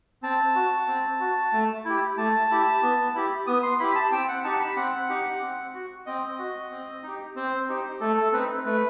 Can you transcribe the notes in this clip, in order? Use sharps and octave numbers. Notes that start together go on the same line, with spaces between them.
C4 A5
F#4
C4
F#4
A3
E4 G4
A3 A5
E4 G4
B3
E4 G4
B3 D#6
C6
E4 G4 B5
A5
C4 G5
F#5
D#4 G4 A5
B5
C4 F#5
D#4 G4
C4
F#4
C4 D#5
F#4
C4
D#4 G4
C4 C5
D#4 G4
A3 A4
A4
C4 D#4 B4
A3 B4